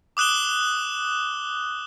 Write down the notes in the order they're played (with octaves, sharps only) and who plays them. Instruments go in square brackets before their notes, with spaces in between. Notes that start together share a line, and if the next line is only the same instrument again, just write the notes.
[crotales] D6 D#6 F#6 E7 G7